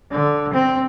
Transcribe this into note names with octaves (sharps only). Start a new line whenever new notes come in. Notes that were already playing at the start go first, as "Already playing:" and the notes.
D3
C4